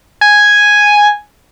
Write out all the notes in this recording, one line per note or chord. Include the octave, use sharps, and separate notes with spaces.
G#5